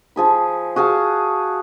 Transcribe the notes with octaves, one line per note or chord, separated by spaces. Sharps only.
F3 G#4 B5
F#4 G#4 F5 A5